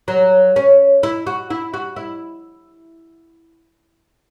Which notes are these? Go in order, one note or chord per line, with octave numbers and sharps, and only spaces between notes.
F#3
C#4
E4
F#4
E4
F#4
E4